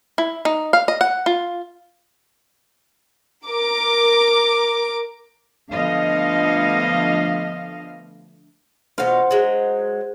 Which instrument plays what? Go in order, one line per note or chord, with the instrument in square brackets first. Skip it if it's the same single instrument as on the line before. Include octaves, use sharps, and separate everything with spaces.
[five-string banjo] E4
D#4
F5
D#5
F#5
F4
[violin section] A#4 D6
[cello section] D3 F3 A3 B3 D#5 F5
[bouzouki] B2 F5 [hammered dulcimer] C5 F#5
[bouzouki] F#3 G#3